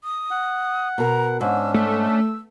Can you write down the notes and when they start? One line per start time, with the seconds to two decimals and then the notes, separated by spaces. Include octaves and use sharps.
0.04 D#6
0.31 F#5
0.98 B2 A#4 A#5
1.41 G#2 C#4 D4 E6
1.74 A3 E6